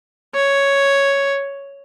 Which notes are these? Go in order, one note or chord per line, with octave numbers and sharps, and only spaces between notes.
C#5